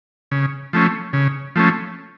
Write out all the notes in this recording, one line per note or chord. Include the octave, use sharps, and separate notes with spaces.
C#3
F3 A3 C#4
C#3
F3 A3 C#4